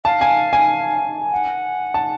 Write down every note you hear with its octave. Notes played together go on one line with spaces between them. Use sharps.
F5 A5
G#5
G#5
F#5
A5